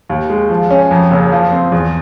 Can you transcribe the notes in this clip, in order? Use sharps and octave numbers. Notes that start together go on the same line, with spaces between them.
D#2
G#3
F3
C#4
F2
F#1
F3
C4
E2